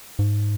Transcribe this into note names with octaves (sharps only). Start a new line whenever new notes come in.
G#2